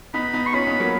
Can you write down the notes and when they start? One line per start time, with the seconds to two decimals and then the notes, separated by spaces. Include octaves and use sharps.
0.14 B3 D#4 B5
0.33 B3 D#4
0.46 C#6
0.53 C#4 F4 B5
0.67 B3 D#4
0.80 F#3 A#3